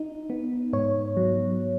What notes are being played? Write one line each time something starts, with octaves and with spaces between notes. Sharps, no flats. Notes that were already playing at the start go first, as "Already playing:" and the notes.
Already playing: D#4
B3
G#2 C#5
F#3